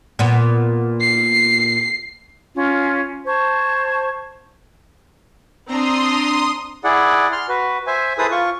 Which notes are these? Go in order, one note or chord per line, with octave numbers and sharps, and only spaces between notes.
A#2 B3
C7
C#4 F4
C5 A5 C#6 G#6
C4 D4 A#5 C6 D#6
E4 G#4 D5 F#5
C6 F6
F#4 B4
C5 E5 G#5
E4 G#4 A4 B4 C5 D#6
F4 C#6